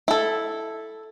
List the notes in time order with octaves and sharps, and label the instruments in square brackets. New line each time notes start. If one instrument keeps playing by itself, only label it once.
[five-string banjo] E4 A4